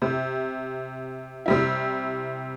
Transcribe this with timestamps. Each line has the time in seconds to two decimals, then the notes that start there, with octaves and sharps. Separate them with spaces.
0.02 C3
1.46 C3 G3 E4